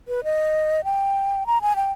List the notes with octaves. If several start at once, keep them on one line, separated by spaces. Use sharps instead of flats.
B4
D#5
G5
A#5
G#5
G5